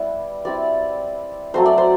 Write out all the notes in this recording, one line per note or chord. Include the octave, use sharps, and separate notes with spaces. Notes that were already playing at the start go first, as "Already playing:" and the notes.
Already playing: G3 B3 E4 E5
G3 C4 E4 D5
F#3 A3 C4 C5
D5
C5